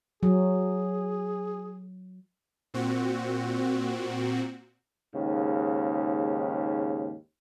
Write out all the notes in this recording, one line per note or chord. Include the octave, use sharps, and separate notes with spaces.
F#3 G#4
A#2 C4 F#4
D#2 G#2 C#3